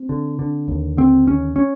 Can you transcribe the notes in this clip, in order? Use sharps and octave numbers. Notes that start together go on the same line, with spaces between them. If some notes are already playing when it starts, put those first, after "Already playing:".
Already playing: C4
D3
D3
D#2
D3 C4
D#2 C#4
C#4